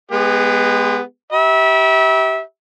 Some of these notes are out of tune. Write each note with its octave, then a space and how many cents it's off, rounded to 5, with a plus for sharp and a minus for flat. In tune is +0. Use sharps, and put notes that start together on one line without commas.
G#3 +0 B3 +0 G4 +35
G4 -20 E5 -25 B5 -45